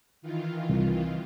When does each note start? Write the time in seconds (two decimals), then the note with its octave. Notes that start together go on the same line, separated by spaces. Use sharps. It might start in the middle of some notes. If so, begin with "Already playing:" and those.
0.22 D#3 E3 F4
0.69 C2